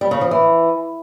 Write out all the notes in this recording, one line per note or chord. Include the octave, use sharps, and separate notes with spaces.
G3
C#3
F3
E3